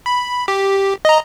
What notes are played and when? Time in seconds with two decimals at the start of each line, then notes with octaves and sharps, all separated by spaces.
0.06 B5
0.48 G4
1.05 D#5 A#5